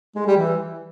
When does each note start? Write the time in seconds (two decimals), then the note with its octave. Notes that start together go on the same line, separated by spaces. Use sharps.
0.16 G#3
0.26 G3
0.37 E3